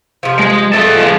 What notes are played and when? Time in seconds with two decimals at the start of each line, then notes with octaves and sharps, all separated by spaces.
0.23 C3 F3
0.39 G#3
0.73 A3 G#4 A4 D#5
0.96 F3 G#3